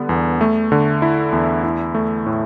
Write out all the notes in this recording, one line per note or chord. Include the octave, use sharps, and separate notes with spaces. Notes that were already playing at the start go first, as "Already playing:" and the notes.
Already playing: D3 G3 B3
E2
A3
D3
E4
E2
E4
A3
A2